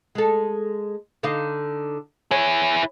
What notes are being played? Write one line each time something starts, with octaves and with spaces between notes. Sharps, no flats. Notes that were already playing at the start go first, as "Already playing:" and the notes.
G#3 A4
D3 D#4 F5
E4 G#4 C#5